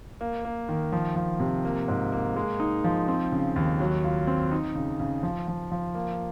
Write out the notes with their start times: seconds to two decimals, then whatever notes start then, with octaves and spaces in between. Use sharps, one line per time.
0.21 A#3
0.45 A#3
0.69 D#3
0.92 F3
1.16 F3
1.40 C3
1.65 A#3
1.88 G#2
2.12 A#3
2.36 G#3
2.60 D#4
2.84 F3
3.08 C4
3.32 C#3
3.56 D#2
3.80 F#3
4.04 F4
4.27 C4
4.52 D#4
4.75 C#3
5.00 C#3
5.23 F3
5.48 F3
5.72 F3
5.95 A#3